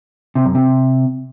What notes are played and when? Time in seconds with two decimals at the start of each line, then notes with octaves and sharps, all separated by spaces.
0.35 C3
0.45 F#2
0.55 C3